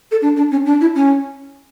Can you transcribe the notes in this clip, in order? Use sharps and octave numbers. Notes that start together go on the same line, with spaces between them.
A4
D4
D4
C#4
D4
E4
C#4